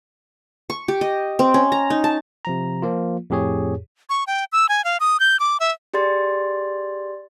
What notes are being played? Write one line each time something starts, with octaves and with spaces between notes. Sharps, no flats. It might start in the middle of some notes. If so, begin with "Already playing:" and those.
C#6
G4
D#5
C4
C#4
A#5
D#4
A5
C3 F3 A#5
F3 A#3 F4
F2 A2 G4 G#4 C#5
C#6
G5
E6
G#5
F5
D#6
G6
D6
E5
G4 G#4 D5 C6 A6